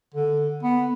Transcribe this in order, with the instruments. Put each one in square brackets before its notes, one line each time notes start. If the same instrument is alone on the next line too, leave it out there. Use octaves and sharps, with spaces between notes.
[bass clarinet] D3
B3